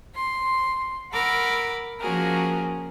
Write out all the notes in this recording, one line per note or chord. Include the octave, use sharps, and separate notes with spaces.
C6
A#4 F#5 B5 D6 E6
F3 A#3 C#4 F#4 G#4 A#4